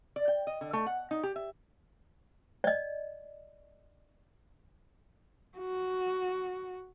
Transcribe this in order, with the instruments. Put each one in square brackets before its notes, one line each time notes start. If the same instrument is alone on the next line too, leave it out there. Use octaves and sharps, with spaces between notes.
[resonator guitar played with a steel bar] D5
G5
D#5
D3
A3
F#5
D#4
G4
E5
[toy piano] D5 D#5
[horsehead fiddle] F#4